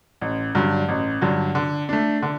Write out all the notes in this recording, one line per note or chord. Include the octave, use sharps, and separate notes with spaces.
A1
G2 D3 F#3
A1
G2 D3 F#3
D3
A3 D4
D3